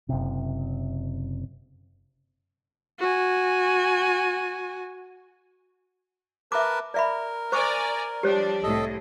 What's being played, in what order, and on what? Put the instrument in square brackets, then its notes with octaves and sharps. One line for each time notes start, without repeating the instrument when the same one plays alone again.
[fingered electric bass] F#1 C3
[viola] F#4 G#5
[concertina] A#4 B4 A5 [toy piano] E5 D6
[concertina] A#4 [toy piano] D5 E5 B5
[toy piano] C5 C#6 D6 [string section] D5 G#5 A#5
[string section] F3 G3 D4 [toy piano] G4 C5 C#5
[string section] C2 A2 [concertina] A4 D#5